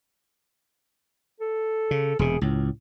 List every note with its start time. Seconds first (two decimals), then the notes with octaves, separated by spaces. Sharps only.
1.41 A4
1.91 C#3
2.19 E1 C3 G#4
2.41 C#2 A2